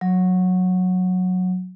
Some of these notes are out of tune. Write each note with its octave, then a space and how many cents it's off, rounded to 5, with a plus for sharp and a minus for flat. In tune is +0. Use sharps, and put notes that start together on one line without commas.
F#3 -15